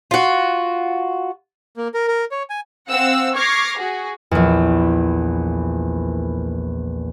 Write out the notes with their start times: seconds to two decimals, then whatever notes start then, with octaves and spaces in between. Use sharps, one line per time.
0.11 F4 F#4
1.77 A#3
1.94 A#4
2.08 A#4
2.31 C#5
2.50 G#5
2.89 C4 F5 F#5 E6
3.34 C#6 D6 F6 G#6 A#6 C7
3.76 F#4 G#4
4.31 A#1 E2